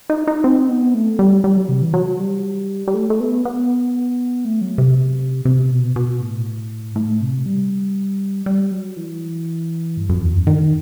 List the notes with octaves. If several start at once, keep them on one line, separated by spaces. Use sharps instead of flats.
D#4
D#4
C4
B3
A3
G3
G3
F#3
C3
E3
F#3
G3
G3
A3
A3
B3
B3
A3
F#3
C3
C3
B2
B2
A2
A2
C3
G3
G3
F#3
E3
G2
F#2
E2
F#2
D#3